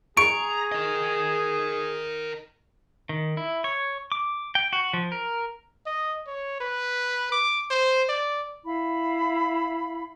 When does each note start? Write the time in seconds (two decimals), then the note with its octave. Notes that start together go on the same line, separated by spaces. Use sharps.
0.17 G#4 A#5 C#6 D7
0.72 A#4 D#5
3.09 D#3
3.37 E4
3.64 C#5
4.12 D6
4.55 G5
4.73 F#4
4.93 F3
5.12 A#4
5.86 D#5
6.27 C#5
6.60 B4
7.32 D6
7.70 C5
8.09 D5
8.65 E4 F5 B5